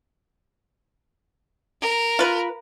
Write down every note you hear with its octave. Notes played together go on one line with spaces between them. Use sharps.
A#4
F4 B4